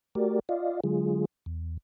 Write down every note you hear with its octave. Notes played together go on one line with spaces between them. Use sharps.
A3 F#4 G4 A#4 D5
F4 D5 D#5 F5
D3 F#3 G#3 F4 G#4
E2